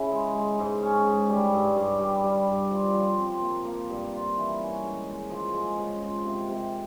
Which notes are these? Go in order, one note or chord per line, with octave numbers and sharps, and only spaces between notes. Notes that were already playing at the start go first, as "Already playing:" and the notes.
Already playing: C#3 E4
G#3
G#3
G#2
C#4
G#2
G3
G2
G2
G3
G3
G2
F3
F3
C4
A#3
A#3
G2
F4
E3
C#4
G#3
G#3
F3
G#3
C#3
F3
C3
C3